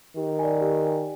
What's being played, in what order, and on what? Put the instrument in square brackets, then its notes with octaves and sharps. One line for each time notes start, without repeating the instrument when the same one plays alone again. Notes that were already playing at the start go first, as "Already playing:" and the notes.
[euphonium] D#3 [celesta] G4
[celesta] D5 G#5
G4
D5 G#5